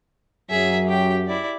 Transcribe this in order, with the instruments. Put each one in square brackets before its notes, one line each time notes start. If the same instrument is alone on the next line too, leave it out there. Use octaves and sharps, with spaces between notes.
[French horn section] F#2 F#3 [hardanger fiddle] G#4 E5
[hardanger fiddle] G4 G5
E4 D5